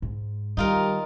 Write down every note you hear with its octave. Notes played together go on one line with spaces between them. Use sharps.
G#2
D#3 G3 D#4 F4 A#4